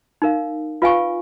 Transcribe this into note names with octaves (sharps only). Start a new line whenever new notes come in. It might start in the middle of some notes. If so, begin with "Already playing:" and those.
D#4 A#4 F5
F4 B4 F5 G#5 C#6